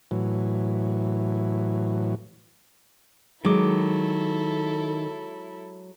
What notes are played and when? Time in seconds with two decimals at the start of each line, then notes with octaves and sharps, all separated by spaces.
0.11 A2 E3 F#3
3.45 D#3 F#3 G#3 E4 A4 D6